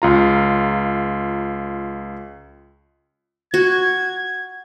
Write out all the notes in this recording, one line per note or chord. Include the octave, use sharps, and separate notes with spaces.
C#2 F4 A#5
F#4 G#6